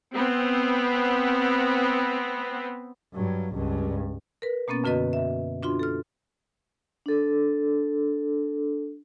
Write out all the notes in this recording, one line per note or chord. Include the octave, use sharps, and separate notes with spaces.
B3 C4
G2 F#3
C#2 G2
A#4 B4
B2 A#3 B3 C#4 A6
F#2 D3 F#4 B4 D#5
E5
D4 F4 F#4 C6
A4 F6
D4 A4